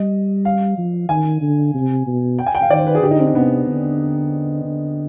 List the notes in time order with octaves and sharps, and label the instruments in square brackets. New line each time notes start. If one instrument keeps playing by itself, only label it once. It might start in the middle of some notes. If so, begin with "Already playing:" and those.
Already playing: [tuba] G3 [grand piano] D#5
[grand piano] F5
[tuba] F3
[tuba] D#3 [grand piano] G#5
[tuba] D3
C3
B2
[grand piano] G5
G#5
G5
F5
[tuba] D#3 [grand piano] D5
[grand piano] C5
B4
G#4
[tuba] D3 [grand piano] G4
[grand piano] D#4
C4
D4
[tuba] C3 [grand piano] B3
[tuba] D3
D3